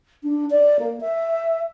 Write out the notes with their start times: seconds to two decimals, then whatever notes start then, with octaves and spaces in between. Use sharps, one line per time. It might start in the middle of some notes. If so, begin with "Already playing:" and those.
0.23 D4
0.50 D5
0.79 A#3
1.01 E5